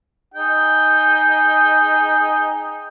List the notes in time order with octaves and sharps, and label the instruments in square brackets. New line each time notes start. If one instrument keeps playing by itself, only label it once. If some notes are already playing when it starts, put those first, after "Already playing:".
[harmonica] D#4 G#4 G5